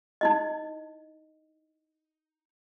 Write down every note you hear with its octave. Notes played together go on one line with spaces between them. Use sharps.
D#4 E4 D#5